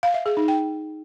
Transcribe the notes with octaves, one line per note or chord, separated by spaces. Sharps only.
F5
E5
G#4
D#4
G5